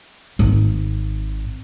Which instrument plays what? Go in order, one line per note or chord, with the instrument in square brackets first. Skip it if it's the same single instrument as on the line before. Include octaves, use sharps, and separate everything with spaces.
[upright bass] G#1